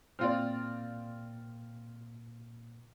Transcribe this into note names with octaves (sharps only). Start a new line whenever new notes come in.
A#2 C4 F4 D5 F6